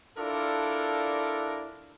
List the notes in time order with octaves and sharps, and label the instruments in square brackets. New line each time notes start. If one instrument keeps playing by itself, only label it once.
[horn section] D4 E4 F4 A4 A#4 D5